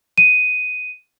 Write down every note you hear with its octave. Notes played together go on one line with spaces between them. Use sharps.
D#7